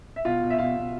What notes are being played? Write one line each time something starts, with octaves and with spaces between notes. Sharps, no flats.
E5
B2 F4 F5
B2
E5
B2 F4 F5
B2